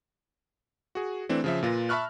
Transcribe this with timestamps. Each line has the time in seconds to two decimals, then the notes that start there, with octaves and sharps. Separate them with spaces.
0.95 F#4 G#4
1.29 E3 A3 C4 D4
1.44 C#3 F3 E5
1.63 A#2 F4 B4 A#6
1.89 E5 A5 B5 C#6 F6 F#6